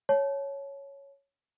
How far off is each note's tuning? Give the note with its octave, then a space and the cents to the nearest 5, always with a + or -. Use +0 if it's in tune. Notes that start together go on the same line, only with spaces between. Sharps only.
C#5 +0 A5 -25